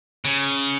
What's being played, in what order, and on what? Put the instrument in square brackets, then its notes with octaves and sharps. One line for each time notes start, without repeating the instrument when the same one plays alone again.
[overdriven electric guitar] C#3